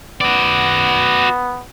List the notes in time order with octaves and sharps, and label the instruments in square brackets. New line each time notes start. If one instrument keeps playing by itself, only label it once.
[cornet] B3 [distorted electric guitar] F#4 D5